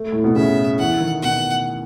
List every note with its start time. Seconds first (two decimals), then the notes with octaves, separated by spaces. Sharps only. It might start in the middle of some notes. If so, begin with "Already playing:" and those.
Already playing: A3
0.12 A2
0.24 B2
0.36 C#3 E5
0.79 E3 F#5
1.00 D#3
1.22 B2 F#5